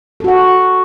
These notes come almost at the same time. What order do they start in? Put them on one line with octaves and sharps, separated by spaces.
A4 F#4 F#5